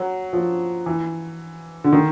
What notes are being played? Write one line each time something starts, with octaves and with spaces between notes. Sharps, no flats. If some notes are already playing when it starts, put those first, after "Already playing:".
Already playing: F#3
F3
E3
D3
D#3